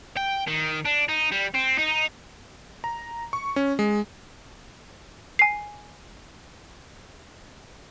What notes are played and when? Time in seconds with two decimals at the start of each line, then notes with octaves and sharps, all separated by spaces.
0.17 G5
0.47 D#3
0.85 D4
1.09 D#4
1.31 G3
1.54 C4
1.78 D#4
2.84 A#5
3.33 C#6
3.56 C#4
3.79 G#3
5.39 G#5 C7